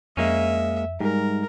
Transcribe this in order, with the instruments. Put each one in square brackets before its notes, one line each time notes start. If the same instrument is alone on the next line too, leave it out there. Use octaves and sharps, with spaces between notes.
[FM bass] F2 [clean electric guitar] G#3 A#3 C#4 [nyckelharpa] E5
[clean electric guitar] G#2 [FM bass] G3 [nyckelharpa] A#4